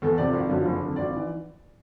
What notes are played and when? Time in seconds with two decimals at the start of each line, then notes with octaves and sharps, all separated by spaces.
0.02 E2 A4
0.18 C3 F3 D5
0.33 G#1
0.49 F#2 D3 F3
0.65 F#1
0.80 F2 D3
0.96 G#1 D5
1.16 E3